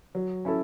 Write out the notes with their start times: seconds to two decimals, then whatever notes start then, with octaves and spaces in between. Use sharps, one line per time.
0.15 F#3
0.45 C#4 E4 A4